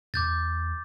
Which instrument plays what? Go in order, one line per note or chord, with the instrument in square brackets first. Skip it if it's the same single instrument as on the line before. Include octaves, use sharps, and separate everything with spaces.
[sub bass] E2 [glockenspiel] D6 G6 A6